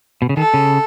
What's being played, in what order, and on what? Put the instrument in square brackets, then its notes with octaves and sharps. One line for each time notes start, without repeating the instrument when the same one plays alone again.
[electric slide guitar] B2
C#3
[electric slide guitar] D#3 [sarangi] A4
[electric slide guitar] C#3